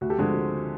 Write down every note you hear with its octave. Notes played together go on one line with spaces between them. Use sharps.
D2 F#4
G4 A4
D3 F3 G#3 C4 F#4